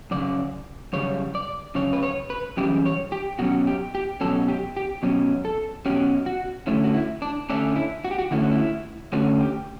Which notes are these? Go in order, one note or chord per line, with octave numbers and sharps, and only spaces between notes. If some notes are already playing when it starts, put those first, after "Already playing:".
F#2 C#3 D5
F#2 C#3 G3 C#5
D5
F#2 C#3 C#5
B4
C#5
B4
F#2 C#3 E3 G3 G4
C#5
G4
B2 F#3 C#4 F#4
G4
G4
B2 F#3 C#4 A4
G4
G4
B2 F#3 C#4
A4
B2 F#3 C#4 G4
F#4
D3 A3 C#4 E4
F#4
E4
D4
D3 A3 C#4 D4
E4
F#4
G4
F#4
D3 A3 C#4 E4
F#4
E4
D3 A3 C#4 F#4
G4